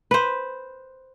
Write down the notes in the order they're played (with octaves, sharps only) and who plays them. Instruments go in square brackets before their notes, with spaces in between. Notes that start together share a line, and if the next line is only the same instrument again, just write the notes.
[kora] B4 C5